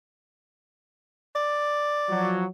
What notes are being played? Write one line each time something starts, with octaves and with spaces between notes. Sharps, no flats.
D5
F3 F#3